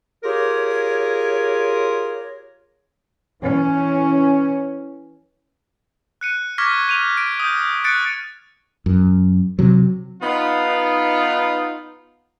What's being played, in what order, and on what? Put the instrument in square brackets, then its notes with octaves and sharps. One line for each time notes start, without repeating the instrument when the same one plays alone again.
[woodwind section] F4 G4 G#4 A#4 C#5
[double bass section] E3 C#4
[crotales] F#6 C#7 D#7
C#6 D6 F6 G#6 A#6 B6
G6 D#7 F7
D7
D#6 G6
F#6 A6 C#7 D7
[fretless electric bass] F#2
C3 F#3
[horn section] B3 D#4 F4